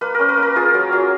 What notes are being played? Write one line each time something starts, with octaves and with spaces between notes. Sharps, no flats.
A#3 B4
C#4 A#4
B4
A#3
A#4
F4 G#4
F#3
F#3